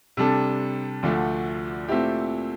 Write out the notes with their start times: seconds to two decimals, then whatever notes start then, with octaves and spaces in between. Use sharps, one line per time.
0.17 C3 G3 D4 A4
1.03 D2 D3 F3 A3 D4
1.88 A#2 A3 C4 E4 G4